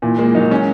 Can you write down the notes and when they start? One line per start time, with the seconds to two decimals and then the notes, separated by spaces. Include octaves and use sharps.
0.02 A#2 E3
0.18 G#3 A#3
0.35 F#3 D#4
0.51 G#3 C#4